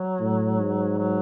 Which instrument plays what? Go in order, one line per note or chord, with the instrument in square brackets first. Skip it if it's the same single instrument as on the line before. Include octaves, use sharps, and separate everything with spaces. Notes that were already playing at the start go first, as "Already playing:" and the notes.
Already playing: [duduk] F#3
[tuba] A2
G#2
[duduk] F#3